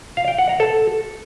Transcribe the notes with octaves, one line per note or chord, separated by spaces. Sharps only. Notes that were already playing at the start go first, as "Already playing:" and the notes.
F5
G5
F#5
A#5
A4